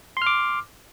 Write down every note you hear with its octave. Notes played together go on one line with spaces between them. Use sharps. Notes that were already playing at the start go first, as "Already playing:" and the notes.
C6 D6 F6